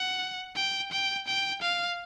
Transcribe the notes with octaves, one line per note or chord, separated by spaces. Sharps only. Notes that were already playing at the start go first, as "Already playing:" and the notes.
Already playing: F#5
G5
G5
G5
F5